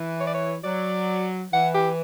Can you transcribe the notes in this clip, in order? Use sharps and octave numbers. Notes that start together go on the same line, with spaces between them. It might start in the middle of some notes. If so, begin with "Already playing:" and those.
Already playing: E3
C#5
D5
C#5
F#3 D5
E3 F#5
G4